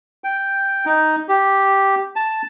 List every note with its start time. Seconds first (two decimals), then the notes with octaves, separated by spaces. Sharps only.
0.24 G5
0.86 D#4
1.29 G4
2.16 A5